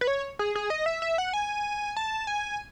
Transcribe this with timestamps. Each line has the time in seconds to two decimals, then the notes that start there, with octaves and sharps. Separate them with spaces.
0.01 B4
0.07 C#5
0.39 G#4
0.55 G#4
0.70 D#5
0.86 E5
1.02 E5
1.18 F#5
1.33 G#5
1.97 A5
2.27 G#5